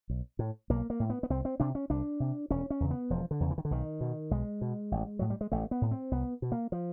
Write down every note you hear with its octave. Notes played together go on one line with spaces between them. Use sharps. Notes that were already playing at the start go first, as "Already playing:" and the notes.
B1
A2
B1 A#3
A#3
A2
B3
B3
C2 C4
C4
C3 D4
C#4
C2 D4
C3
E1 C#4
C#4
E2 C#3
B3
E1 F3
D3
E2 C#3
E3
D#3
D3
B1 D#3
B2
B1 G#3
B2
A1
A2 F#3
G3
G#3
A1 A3
B3
A2
C4
C2 B3
B2
A#3
F3